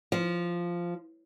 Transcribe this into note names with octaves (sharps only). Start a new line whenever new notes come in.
F3